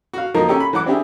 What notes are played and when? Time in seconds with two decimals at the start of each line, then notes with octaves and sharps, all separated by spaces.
0.13 F#4 F5
0.34 F3 A#3 D#4 A#4 A5
0.48 C#4 G4 A4 A#4
0.60 B5
0.73 E3 F#3 F#5 D6
0.86 C4 D4 E4 G4 G#4